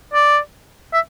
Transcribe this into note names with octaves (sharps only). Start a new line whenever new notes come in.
D5
E5